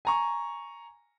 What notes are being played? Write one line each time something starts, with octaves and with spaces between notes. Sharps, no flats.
G#5 A#5 C#6